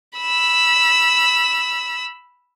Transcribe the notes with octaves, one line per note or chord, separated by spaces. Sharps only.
B5 E6